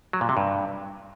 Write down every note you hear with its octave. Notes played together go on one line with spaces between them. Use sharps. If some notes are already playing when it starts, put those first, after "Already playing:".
F#3
A#2
C3
G2